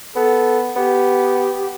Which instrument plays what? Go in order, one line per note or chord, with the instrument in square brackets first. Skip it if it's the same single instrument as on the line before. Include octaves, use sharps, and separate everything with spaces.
[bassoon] B3 [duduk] A4
[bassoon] B3 [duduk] G4